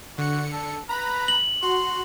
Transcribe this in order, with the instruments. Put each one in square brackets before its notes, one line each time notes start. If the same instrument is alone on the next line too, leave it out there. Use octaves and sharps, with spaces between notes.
[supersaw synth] D3 C#7 [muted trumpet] F#4
[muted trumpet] A4
[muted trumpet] B4 [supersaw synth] A#5 B5
[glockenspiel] F#7
[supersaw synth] F#4 [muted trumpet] C6